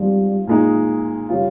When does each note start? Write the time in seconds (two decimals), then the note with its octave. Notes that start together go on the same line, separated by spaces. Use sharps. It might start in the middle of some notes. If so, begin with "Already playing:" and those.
Already playing: G#2 F3 G3 C4 F4
0.47 A#2 G#3 D#4
1.29 C#3 G3 C#4 F4